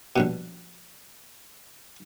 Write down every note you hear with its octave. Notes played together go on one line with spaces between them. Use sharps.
A#1 G2 B2